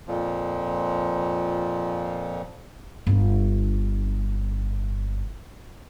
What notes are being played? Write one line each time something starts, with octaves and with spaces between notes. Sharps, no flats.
F2 A#2 F3
G1 D4